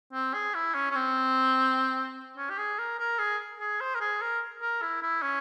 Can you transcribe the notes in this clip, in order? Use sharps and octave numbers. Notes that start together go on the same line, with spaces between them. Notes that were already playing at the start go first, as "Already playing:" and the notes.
C4
G#4
E4
C#4
C#4
C4
C#4
G4
G#4
A#4
A#4
G#4
G#4
C5
A#4
G#4
A#4
A#4
E4
E4
C#4